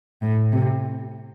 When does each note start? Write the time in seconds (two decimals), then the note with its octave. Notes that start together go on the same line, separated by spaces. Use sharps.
0.22 A2
0.52 C3